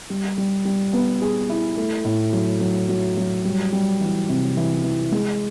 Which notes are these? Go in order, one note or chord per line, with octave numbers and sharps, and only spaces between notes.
G3
G3
G3
B3
G#4
E4
A3
A2
F#3
F#3
F#3
F#3
G3
G3
E3
C3
E3
E3
G#3